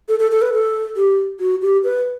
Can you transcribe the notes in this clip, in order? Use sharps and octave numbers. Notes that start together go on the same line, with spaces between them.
A4
A4
A4
B4
A4
G4
F#4
G4
B4